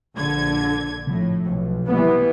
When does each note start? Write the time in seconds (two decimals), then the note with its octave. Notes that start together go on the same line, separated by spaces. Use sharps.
0.16 A#1 D3 G#6
1.07 A2 C3 F3
1.45 B1
1.87 E3 G3 B3